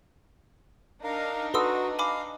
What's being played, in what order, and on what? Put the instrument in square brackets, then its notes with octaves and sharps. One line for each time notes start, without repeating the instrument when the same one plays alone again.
[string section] D4 D#4 [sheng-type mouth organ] A#4 F5
[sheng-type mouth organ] F#4 [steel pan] A4 B4 [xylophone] C6 D#6 E6
[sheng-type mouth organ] F5 [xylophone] G#5 B5 D6